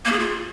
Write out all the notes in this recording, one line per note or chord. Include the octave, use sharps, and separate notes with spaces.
A#3
G#4
F4